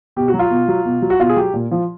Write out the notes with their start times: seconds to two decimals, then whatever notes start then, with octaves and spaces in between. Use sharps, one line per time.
0.16 B2 G4
0.28 F#4
0.34 F#3
0.39 F4
0.50 B2
0.68 F#3
0.85 B2
1.02 F#3
1.10 F#4
1.19 B2 F4
1.29 G#4
1.36 F#3 G4
1.54 A#2
1.71 F3